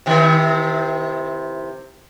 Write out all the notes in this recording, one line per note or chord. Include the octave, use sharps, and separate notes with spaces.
C3 D#3 E3